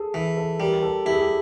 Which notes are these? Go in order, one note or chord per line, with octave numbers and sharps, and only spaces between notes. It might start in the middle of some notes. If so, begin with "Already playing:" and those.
Already playing: G#4 A4
E3 G#4
A4
G3 A#4
A4
E4 G4
G#4
G4